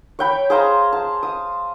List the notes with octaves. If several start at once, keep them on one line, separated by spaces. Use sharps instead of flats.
C#5 G5 B5
G#4 C5 F5 A#5
A5
D#6